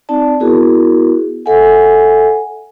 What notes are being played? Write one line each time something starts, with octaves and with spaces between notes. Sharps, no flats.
C4 D#4 D5 A5
B3 E4 F#4 G#4 A#4
A4 E5 F#5 G#5